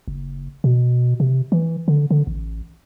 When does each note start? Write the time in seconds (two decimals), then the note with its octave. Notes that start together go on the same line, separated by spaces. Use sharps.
0.08 F#1
0.64 B2
1.20 C3
1.52 E3
1.88 D3
2.11 D3
2.27 A1